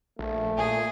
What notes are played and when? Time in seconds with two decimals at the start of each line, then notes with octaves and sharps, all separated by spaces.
0.19 A#1 A3
0.58 A#2 G#4 G#5